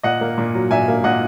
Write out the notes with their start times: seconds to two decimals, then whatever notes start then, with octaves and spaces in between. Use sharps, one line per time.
0.03 A#2 D#5 F#5
0.21 A#3
0.38 A#2
0.55 F#3
0.70 A#2 E5 G#5
0.88 A#3
1.04 A#2 D#5 F#5